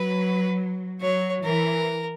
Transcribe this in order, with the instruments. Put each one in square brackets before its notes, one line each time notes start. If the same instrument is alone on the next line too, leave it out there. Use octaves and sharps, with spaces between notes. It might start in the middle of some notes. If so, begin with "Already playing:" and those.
Already playing: [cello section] F#3 [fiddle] B4
[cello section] F#3 [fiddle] C#5
[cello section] E3 [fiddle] A#4